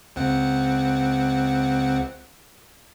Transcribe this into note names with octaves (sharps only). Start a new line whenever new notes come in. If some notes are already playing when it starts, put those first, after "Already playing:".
C#2 C4 F#5